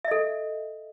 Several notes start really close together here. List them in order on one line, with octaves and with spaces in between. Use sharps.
E5 D#5 A4